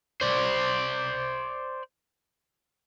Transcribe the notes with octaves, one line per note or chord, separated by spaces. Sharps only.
C5 D5